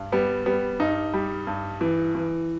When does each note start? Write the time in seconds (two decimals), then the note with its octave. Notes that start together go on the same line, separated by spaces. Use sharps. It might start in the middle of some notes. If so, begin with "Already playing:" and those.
Already playing: G2
0.12 G3 B3
0.46 G3 B3
0.80 G2 D#4
1.14 G3
1.47 G2
1.81 E3
2.15 E3